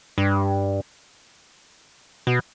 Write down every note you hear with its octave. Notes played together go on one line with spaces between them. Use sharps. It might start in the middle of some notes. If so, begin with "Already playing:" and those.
G2
B2